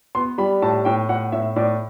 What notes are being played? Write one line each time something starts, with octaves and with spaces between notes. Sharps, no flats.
B3 C6
G3 B5
A2 A5
A2 G5
A2 F#5
A2 E5
A2 D5